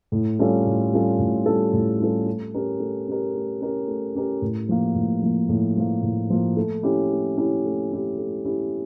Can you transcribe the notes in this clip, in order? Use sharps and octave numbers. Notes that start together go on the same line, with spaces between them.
A2
G3 C#4 F4 A4
A2
G3 C#4 F4 A4
A2
G3 C#4 F4 A4
A2
G3 C#4 F4 A4
A3
C#4 G4 A#4
A3
C#4 G4 A#4
A3
C#4 G4 A#4
A3
C#4 G4 A#4
A2
F3 A#3
A2
F3 A#3
A2
F3 A#3
A2
F3 A#3
A3
C#4 E4 G4
A3
C#4 E4 G4
A3
C#4 E4 G4
A3
C#4 E4 G4